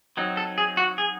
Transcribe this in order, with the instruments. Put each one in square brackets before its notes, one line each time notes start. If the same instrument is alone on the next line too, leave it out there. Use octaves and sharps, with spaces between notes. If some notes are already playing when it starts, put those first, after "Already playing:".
[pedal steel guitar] F#3 C4 D#4
A4
G#4
F#4
G#4